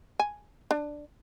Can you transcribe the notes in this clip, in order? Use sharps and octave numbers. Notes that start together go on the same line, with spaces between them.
G#5
D4